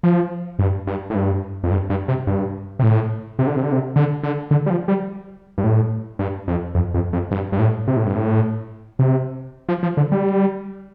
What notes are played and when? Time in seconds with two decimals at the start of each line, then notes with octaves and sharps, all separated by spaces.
0.03 F3
0.59 G2
0.87 G2
1.10 A2
1.15 G2
1.64 F2
1.71 G2
1.90 G2
2.08 C3
2.27 G2
2.79 C3
2.83 A2
3.39 C3
3.47 D3
3.56 C3
3.63 D3
3.72 C3
3.96 D3
4.23 D3
4.51 D3
4.66 G3
4.70 F3
4.88 G3
5.58 G2
5.64 A2
6.19 G2
6.48 F2
6.75 F2
6.94 F2
7.13 F2
7.31 G2
7.52 G2
7.59 A2
7.88 C3
7.97 A2
8.06 G2
8.15 A2
8.99 C3
9.69 F3
9.83 F3
9.97 D3
10.12 G3